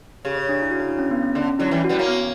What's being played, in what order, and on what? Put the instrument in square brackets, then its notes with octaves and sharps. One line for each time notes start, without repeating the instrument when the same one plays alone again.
[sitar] C#3 [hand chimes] G4
[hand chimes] C#5
D4
E4
F#4
E4
D4
C#4
B3
C#4
[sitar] D3 [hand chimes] C#4
[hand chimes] C#4
[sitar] D3 F#3 [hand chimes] E4
[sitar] E3 G3 [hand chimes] E4
[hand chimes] F#4
[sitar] G3 B3
A#3 C#4
[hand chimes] B3